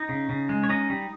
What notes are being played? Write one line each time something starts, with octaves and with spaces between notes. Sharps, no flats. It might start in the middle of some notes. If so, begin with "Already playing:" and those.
Already playing: D#4 D#5
C#3
C#3
G#3
C#5
C#4 D#4 D#5
G3